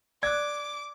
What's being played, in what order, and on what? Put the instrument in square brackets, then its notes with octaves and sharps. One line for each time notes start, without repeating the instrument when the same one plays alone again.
[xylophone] D5 F#6 [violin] D6 [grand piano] G#6